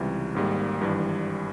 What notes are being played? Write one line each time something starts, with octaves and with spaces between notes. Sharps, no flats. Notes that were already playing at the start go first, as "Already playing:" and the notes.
Already playing: C#2 C3 E3 G3
G#1 G#2 G3 A#3
G#1 G2 E3 G3